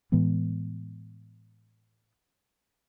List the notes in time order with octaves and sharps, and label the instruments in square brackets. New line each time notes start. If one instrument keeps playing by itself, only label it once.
[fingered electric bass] A2 E3 G#3 B3